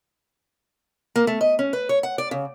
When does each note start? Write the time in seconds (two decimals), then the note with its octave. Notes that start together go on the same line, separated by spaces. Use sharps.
1.16 A#3
1.27 A3
1.41 D#5
1.59 C#4
1.73 B4
1.89 C#5
2.03 F#5
2.18 D5
2.31 C#3